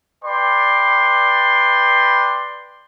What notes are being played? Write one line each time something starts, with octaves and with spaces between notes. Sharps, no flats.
B4 D5 G5 C6